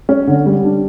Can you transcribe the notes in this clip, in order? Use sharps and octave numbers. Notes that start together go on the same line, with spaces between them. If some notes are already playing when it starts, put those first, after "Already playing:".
C#4
D3
G3
D4